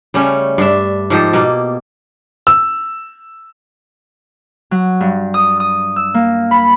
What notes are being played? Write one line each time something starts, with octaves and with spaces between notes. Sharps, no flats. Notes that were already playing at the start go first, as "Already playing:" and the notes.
C#3 G3 A3 C#4
G2 D4 E5
G#2 F3 G4 A4
B2 A#3
E6
F#3
G2
D#6
D#6
E6
A#3
B5